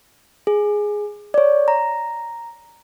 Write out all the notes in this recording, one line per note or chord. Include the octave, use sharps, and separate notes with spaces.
G#4
C#5 D5
A#5